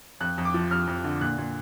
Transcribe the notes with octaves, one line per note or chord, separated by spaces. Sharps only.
F2 F#6
F2
D6
F3
F2 F6
F2
D3
A#2 F#6
A#2